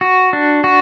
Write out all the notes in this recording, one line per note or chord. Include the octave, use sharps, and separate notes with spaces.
F#4
D4
F#4